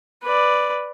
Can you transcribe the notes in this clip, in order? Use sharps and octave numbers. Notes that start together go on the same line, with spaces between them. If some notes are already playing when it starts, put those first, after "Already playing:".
B4 D5